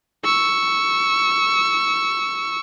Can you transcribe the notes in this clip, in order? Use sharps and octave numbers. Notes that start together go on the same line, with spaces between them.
C#6 E6